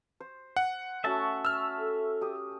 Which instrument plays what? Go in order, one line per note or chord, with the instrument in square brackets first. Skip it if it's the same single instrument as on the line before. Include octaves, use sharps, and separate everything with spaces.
[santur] C5
[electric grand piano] F#5
[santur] A3 C#4 F#4 [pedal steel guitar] E5 A5
[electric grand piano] E6 F6
[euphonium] A4
[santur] G4 D#6